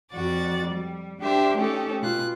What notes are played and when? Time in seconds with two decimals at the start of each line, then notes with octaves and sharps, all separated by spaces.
0.12 F2 F#4 D5 A6
0.66 G3
1.20 D4 G4 C5 E5
1.56 A3 C#4 D#4 G4 A4
2.02 B2 F4 F#6